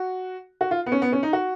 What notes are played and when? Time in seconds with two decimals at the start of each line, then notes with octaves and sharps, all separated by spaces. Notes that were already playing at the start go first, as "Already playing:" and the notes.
Already playing: F#4
0.61 F#4
0.71 F4
0.86 B3
0.92 C#4
1.02 B3
1.12 C#4
1.23 D#4
1.33 F#4